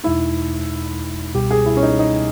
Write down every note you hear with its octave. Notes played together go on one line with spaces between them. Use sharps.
E2 B2 G#3 D#4 E4
C#2 B2 G3 G4
G#4
E4
C#4
D#4
D#4